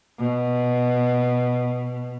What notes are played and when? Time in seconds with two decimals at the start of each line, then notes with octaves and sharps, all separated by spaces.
0.20 B2